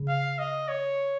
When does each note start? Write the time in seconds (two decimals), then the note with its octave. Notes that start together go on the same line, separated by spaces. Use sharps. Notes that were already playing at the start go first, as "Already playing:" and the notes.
Already playing: C#3
0.08 F5
0.39 D#5
0.68 C#5